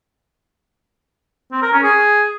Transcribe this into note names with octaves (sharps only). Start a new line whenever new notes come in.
C4
A#4
C#4
G#4